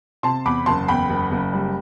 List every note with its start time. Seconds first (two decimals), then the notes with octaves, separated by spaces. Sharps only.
0.23 C3 A5 C6
0.46 E2 B5 D6
0.66 F#1 A5 C6
0.88 E2 G5 B5
1.10 F#1
1.32 F#1
1.53 G3